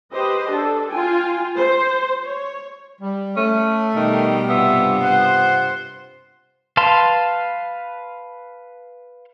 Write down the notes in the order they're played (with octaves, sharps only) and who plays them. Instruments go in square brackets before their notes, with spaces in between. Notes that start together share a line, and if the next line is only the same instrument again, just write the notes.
[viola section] G4 B4 C5 D#5
D4 A4
F4 G5 G#5
C5
C#5
[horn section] G3
[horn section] A3 [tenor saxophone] C#4
[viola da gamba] B2 G3 [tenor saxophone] D#3
[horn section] G2 C3 F4 [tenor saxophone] B3 [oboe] E5
[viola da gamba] C5 [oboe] F#5
[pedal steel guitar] B4 F5 A5 C6